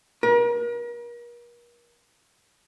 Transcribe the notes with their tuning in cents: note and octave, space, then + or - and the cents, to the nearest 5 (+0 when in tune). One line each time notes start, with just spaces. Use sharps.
A#4 +40